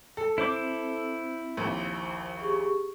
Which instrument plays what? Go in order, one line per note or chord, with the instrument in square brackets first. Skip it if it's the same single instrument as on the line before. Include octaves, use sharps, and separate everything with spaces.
[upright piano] A4
[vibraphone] C4 [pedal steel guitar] E4 C5 D6
[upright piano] A#1 D#2
[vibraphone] G4 G#4 C#6